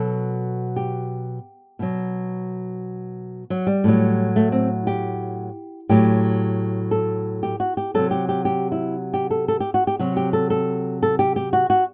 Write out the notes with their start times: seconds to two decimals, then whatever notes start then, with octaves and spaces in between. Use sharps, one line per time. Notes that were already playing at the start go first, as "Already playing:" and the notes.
Already playing: B2 F#3 A4
0.76 G4
1.79 B2 F#3
3.50 F#3
3.67 G3
3.84 A2 F#3
4.36 A3
4.52 C4
4.87 G4
5.89 A2 F#3 G4
6.91 A4
7.43 G4
7.60 F#4
7.77 G4
7.94 C3 F#3 A4
8.11 G4
8.29 G4
8.45 G4
8.72 E4
9.14 G4
9.31 A4
9.48 A4
9.60 G4
9.74 F#4
9.87 G4
9.99 C3 F#3 F#4
10.17 G4
10.33 A4
10.50 A4
11.03 A4
11.19 G4
11.36 G4
11.53 F#4
11.70 F#4